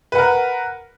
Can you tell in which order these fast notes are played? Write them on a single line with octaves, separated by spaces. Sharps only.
B4 F#5 A#4